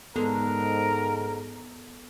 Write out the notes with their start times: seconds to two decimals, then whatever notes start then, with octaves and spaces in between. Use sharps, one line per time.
0.16 G#2 D3 G#3 B3 A4 A#4 A#5